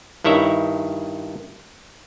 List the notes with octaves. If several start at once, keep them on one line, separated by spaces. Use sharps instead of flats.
G2 D#3 E4 C#5 E5